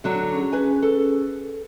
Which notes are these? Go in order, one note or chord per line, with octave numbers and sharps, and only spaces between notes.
D3 F#3 D4
C#4 G#4
B4 G#5
A4